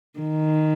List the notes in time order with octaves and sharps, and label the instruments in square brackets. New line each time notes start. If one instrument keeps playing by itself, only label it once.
[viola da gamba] D#3